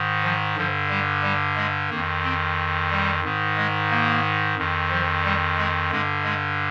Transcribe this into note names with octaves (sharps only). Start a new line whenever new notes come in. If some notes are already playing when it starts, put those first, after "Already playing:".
Already playing: G#2 D#3
F3
G2 D3 F3
G3
G3
G#3
F2 D#3 A#3
C4
G3
G#2 D#3
G#3
A#3
F2 D#3
F3
G3
G#3
G2 D3 G#3
G#3